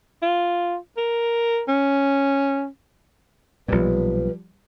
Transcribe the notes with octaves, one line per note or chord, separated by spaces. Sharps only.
F4
A#4
C#4
B1 A#2 F3 G3 B4